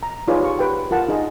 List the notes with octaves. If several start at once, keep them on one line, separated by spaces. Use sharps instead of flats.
A#5
D#4 F4 G#4 B4 C#5 D5
G4 C#6
G4 B4 G5
F4 A#4 F#5 A5
D#4 G#4 D#5